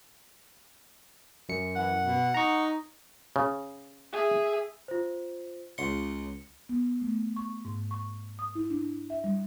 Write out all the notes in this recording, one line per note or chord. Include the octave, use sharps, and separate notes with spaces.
F#2 C#7
E3 F#5
B2
D#4 A#5 C#6
C#3
G#4 E5
F4 C5
C#2 C6 C#7
B3
A3
C#6
G#2
C#6
D#6
E4
D4
E5
G3